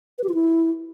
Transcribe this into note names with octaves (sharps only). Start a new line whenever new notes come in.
B4
G4
F4
E4